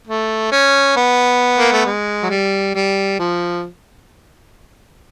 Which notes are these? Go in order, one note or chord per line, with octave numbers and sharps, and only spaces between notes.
A3
C#4
B3
A#3
A3
G#3
F#3
G3
G3
F3